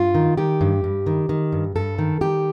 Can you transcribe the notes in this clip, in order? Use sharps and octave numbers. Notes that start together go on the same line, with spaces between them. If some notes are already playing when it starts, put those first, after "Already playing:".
Already playing: G2 F4
D#3
D#3 G4
G2
G2
D#3
D#3
G2
G2 A4
D#3
D#3 G4